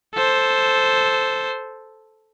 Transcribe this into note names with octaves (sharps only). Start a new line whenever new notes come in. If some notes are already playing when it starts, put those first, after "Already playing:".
A4 C5